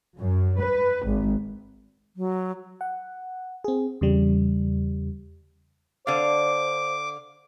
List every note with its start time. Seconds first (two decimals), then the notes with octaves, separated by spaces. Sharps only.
0.18 F#2
0.60 B4
1.07 G#1
2.16 F#3
2.81 F#5
3.64 C4 G#4
4.01 E2 C#3 G3
6.07 D3 C5 F5 D6